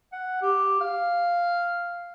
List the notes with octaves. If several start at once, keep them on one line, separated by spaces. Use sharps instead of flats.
F#5
G4
F5